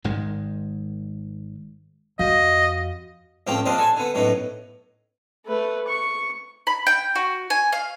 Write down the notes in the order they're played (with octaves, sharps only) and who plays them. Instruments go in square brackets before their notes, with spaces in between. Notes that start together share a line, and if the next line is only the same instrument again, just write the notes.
[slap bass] G#1 G#2 D#3 G#3
[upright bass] F2 [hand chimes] F#4 F5 [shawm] D#5
[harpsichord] C#2 A2 F3 C4 F4 G5
A#1 F3 C4 D4 F4 D#5
A4 G#5 A5
D3 B3
F#2 A2 B3 D#4
[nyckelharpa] A3 B4
C#6
[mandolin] B5
G5
F#4
G#5
F5